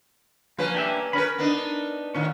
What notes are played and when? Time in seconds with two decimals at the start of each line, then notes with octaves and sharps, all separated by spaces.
0.58 F3 A#3 C#4 B4
0.74 D4 G4 E5
1.13 C#4 A#4 B4 B5
1.38 B3 D4 D#4
2.15 A2 D#3 C#4